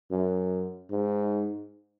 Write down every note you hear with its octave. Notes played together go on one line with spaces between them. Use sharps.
F#2
G#2